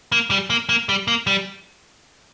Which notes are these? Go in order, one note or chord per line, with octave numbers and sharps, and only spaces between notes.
A#3
G3
A#3
A#3
G3
A#3
G3